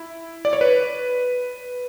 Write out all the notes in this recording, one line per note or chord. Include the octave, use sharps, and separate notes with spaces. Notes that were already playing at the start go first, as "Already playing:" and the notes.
Already playing: E4
D5
C#5
B4